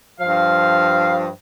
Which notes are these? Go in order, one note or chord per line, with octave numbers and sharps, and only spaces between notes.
G2 F3 F5